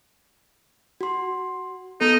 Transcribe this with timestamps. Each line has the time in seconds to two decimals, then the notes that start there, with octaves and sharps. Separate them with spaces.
1.01 F#4 C6
2.01 B3 D#4 A4